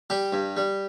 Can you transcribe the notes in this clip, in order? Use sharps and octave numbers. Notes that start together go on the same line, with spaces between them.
G3 G4
G2
G3